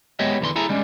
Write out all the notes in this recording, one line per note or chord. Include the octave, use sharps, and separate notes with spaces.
G#3 B3 G4 C#5 D#5 E5
E2 D3 E3 A#5 C6
E4 G#4 A4 E5 G#5 A#5
G3 G#3 C#4 D4